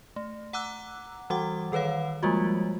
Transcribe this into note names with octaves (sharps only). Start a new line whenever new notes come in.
A3
F#5 A#5 D6 E6 F#6
E3 G3 F#4 F#5 D6
D#3 A4 B4 C#5 F5
F3 G3 G#3 A#3 F4 F#4